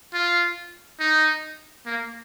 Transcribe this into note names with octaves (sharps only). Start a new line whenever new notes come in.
F4
D#4
A#3